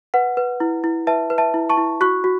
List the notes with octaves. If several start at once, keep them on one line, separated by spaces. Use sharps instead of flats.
B4 F#5
B4
E4
E4
B4 E5 A5
B4
E5 A5
E4
A5 C#6
E4
F#4 C#6 F#6
F#4